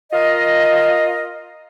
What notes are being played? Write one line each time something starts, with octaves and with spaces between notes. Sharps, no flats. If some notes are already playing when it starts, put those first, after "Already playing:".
F4 A#4 D#5